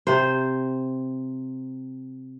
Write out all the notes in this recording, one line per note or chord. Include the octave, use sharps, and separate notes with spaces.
C3 C5